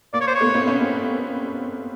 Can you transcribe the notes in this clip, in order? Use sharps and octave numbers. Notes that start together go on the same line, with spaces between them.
A#3 D5
C#5
C5
C#5
A3 B3
A#3 C4
B3 C#4
A#3 C4